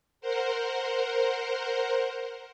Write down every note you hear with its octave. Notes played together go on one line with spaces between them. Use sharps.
A#4 C5 F#5